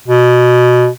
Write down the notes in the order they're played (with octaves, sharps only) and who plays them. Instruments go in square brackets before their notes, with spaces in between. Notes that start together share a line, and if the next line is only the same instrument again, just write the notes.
[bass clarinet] B2